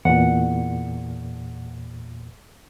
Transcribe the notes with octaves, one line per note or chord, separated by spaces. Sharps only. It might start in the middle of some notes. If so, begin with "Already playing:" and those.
E2 A#2 F#5